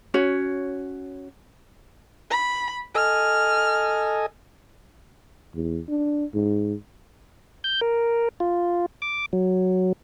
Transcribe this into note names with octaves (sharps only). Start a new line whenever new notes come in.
C#4 F#4 C#5
B5
A4 D#5 G#5 F6
E2
D4
G#2
G6
A#4
F4
D6
F#3